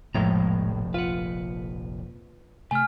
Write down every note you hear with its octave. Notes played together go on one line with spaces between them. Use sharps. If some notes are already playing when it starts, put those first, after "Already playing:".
F1 A#1 F2 A2 F3 G#3 A#5
F4 B4 F#5
C3 A3 G#5 F6